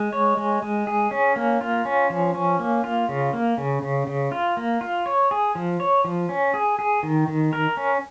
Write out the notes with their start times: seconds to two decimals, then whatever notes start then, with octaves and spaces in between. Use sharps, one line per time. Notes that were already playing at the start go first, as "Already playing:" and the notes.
Already playing: G#3
0.13 C#5
0.37 G#3
0.62 G#3
0.87 G#4
1.11 C#4
1.36 A#3
1.61 F4
1.85 C#4
2.10 F3
2.35 C#4
2.59 A#3
2.84 F4
3.09 C#3
3.33 A#3
3.57 C#3
3.82 C#3
4.07 C#3
4.32 F4
4.57 A#3
4.81 F4
5.06 C#5
5.31 G#4
5.55 F3
5.80 C#5
6.04 F3
6.29 C#4
6.54 G#4
6.79 G#4
7.03 D#3
7.28 D#3
7.53 A#4
7.77 C#4